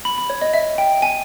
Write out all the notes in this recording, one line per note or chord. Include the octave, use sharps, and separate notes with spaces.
B5
B5
C#5
D#5
E5
G5
G#5